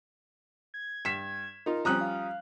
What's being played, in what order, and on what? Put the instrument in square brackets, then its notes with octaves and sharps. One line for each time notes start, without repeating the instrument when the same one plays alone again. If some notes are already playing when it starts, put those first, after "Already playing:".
[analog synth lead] G#6
[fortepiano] G2 [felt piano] B6 E7
[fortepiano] D#4 F4 [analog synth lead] A#4
[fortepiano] F3 G3 C#4 [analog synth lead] C4 [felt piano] A#5 D#6 F#6
[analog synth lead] F5